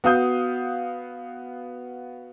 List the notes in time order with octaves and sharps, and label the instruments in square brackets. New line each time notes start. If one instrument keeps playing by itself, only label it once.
[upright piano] B3 F#4 F5 D#6 G6